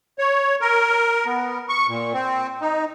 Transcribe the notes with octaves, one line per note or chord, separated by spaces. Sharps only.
C#5
A#4
B3
C#6
A#2
C4
D#4